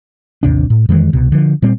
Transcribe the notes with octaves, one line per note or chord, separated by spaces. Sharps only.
A1 D#2 C3 D4
A2
F2 D#3 E3 G#3
C2 B2
D3 F3
A#2 G3 C4